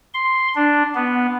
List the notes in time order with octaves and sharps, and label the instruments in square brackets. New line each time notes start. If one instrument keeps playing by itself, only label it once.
[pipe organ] C6
D4
B3